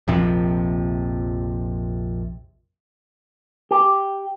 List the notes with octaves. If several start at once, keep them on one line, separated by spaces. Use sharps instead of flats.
A#1 F2 C3 F3
G4